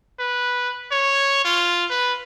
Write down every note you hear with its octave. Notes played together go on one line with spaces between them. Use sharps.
B4
C#5
F4
B4